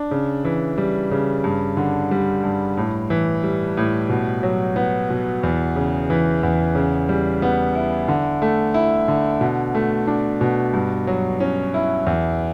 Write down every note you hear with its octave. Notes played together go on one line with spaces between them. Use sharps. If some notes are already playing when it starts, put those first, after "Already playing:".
Already playing: D4
C#3
E3
G3
C#3
G2
D3
G3
G2
A2
E3
G3
A2
B2
F#3
B3
B2
E2
C#3
E3
E2
C#3
G3
B3
E4
D3
A3
E4
D3
B2
A3
D4
B2
G2
F#3
C#4
E4
E2